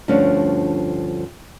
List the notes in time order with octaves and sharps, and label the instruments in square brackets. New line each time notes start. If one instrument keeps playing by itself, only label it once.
[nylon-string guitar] D2 G2 F3 C#4 D4